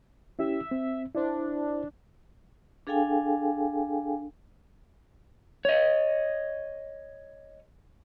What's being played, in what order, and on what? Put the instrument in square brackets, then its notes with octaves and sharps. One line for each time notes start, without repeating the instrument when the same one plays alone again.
[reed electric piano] C#4 E4 G4 [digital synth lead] E5
[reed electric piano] C4
[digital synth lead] D4 [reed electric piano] E4 C5
[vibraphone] D4 G#4 A4 F5 G5 G#5
[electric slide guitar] C#5 D#5